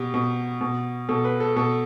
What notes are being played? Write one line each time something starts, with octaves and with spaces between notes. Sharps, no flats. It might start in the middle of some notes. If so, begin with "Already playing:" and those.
Already playing: B2 G4
B2
B2
B2 A4
B4
A4
B2 A4